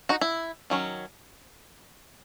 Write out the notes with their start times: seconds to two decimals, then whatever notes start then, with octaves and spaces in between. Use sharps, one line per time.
0.09 D#4 F#4
0.21 E4
0.70 D#3 F#3 C#4